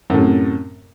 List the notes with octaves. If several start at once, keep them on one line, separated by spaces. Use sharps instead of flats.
F#2 A2 C3